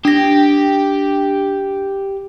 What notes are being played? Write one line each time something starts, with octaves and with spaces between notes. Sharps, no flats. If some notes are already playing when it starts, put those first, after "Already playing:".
D4 G4 A#6